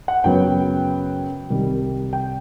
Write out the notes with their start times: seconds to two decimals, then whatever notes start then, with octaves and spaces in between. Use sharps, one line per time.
0.08 F#5
0.24 F#2 C#3 F#3 B3 G5
1.50 C2 C3 D#3 G3
2.13 G5